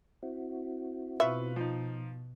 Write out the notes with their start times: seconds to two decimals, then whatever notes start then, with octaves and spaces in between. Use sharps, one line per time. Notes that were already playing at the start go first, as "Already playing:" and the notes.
0.23 C4 E4 F#4
1.20 B2 F4 B4 E5 C#6
1.56 F3 D#4